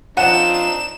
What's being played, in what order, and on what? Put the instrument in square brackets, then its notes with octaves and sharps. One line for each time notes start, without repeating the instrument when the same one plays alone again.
[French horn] F3 [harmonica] C4 D4 D#4 [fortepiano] F#5 [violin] E7